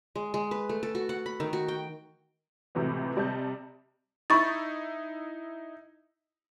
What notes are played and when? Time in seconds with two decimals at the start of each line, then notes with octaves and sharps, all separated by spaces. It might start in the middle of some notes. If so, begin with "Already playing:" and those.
0.15 G#3
0.34 G#3
0.51 B4
0.69 A3
0.83 A4
0.95 F#4
1.09 F#5
1.26 B5
1.40 D#3
1.53 F#4
1.68 G5
2.75 C#2 A2 C3 E3 F#3 B3
3.16 C3 G3 D5 D#5 A5 G6
4.30 D#4 E4 B5 C#6 A6